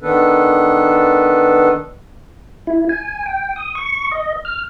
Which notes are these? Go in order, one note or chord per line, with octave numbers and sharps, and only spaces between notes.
D#3 B3 D4 A4 B4
E4
G#5
G5
D#6
C#6
D#5
F6